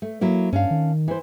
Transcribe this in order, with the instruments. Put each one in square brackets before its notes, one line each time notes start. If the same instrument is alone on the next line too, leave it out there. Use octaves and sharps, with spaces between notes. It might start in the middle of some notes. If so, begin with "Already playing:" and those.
[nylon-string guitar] A3
F#3 A#3 E4
[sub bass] G2 [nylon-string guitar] C#4 D4 F5
[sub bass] D#3
[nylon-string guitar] E3 C5